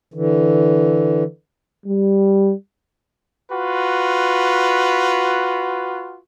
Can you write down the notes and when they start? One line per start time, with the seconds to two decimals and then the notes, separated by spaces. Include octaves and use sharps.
0.14 D3 E3
1.86 G3
3.52 F4 F#4 B4